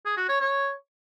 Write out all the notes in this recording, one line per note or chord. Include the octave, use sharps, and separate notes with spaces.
G#4
F#4
C#5
C#5